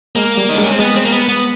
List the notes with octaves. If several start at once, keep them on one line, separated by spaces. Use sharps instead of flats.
G#3 A#3
G3
D#4
G#3 D4
C#4
C4
G#3 B3
C4
A#3
B3
B3